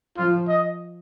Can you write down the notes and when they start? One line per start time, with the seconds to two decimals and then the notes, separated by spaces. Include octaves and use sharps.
0.17 F3 F4
0.48 D#5